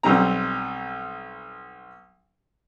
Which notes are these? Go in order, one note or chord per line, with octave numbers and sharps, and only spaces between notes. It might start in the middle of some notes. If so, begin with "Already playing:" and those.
B1 G3 C4 A#5